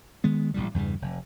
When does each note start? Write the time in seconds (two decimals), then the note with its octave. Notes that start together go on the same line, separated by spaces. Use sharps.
0.24 D#3 G#3 B3
0.54 A1 F2 A2 G3
0.74 E2 G2 C#3 E3
1.02 F1